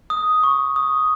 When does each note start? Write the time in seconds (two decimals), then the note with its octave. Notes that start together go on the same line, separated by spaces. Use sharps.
0.10 D#6
0.43 C#6
0.76 D#6